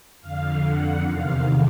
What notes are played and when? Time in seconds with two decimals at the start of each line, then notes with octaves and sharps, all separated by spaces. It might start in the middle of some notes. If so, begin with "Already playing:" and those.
0.21 F2 D3 F5
0.63 F#5
1.04 E2 C3 D#3 F5